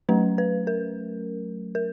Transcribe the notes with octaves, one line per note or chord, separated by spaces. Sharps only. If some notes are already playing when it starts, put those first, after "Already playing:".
F#3 A3 C#4 B4
B4
A#4
A#4